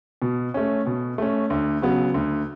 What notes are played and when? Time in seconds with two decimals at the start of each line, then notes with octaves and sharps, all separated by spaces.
0.22 B2
0.54 A3 C#4
0.86 B2
1.18 A3 C#4
1.50 D2
1.82 C#3 F#3 B3
2.14 D2